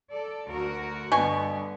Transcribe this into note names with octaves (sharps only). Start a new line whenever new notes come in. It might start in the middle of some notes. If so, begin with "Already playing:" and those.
A4 D5
D2 F#4 A#4
G2 B2 D3 B3 G#5 C#6